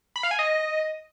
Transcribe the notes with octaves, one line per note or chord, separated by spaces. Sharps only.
B5
F5
G#5
D#5